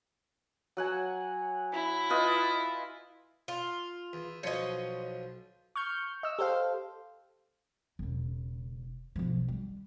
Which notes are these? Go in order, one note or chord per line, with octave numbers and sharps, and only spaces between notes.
F#3 F#5 G#5
E4
F4 B4 D#5
F4
E2
B1 F3 C#5 D#5 C6
C#6 F6 G6
D#5 E6
G4 A4 C5 F5
E1 C#3
B1 F3
G3